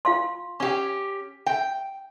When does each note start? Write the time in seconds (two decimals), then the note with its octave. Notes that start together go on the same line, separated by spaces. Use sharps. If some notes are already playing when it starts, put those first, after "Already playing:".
0.05 F4 F5 C6
0.60 C#4 G4 F#5 C#6
1.46 G5